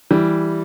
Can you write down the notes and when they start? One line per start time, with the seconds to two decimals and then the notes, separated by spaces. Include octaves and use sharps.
0.11 E3 G3